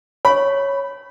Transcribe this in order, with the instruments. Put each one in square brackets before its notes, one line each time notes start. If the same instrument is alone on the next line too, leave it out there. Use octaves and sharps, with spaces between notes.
[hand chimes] C#5 [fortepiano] B5